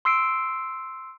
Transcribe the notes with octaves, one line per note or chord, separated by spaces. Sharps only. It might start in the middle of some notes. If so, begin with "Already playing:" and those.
C6 E6 C7 D7